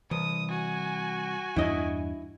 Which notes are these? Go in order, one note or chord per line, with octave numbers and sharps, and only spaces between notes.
C2 E3 D#6
F#4 G#5
E2 G2 D4 E4 D#5